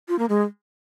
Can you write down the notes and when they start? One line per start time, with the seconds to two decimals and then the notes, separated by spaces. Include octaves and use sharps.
0.08 F4
0.19 A#3
0.29 G#3